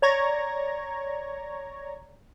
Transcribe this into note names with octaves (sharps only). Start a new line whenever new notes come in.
C#5 D5 A#5 C#6 G#6 A#6